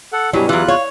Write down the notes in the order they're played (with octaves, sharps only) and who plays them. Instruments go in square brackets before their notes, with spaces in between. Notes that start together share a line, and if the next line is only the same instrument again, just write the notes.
[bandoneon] A4 F#5
[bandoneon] G2 B2 G3 [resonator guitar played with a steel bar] F#3 [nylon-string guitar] E4 G4 G#5
[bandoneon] E2 F4 F#6 [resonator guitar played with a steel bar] E3 F#3
[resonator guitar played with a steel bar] C#5 [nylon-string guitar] F5